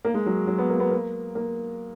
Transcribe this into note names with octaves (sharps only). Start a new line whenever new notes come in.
A#3
G#3
F#3
F#3
B3
A#3
B3
A#3
A#3